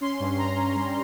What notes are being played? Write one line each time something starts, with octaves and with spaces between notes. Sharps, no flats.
C#4 C6
G2
G2 A#5
C#4
G3